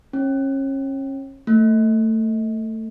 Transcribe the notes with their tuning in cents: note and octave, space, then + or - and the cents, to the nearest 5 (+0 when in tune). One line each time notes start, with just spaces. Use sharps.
C#4 -35
A3 +20